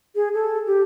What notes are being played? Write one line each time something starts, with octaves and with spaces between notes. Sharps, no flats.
G#4
A4
G4